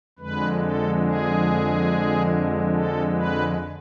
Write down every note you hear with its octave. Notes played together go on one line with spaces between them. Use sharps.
F2 D3 G#3 B4
A4
G#4
A4
B4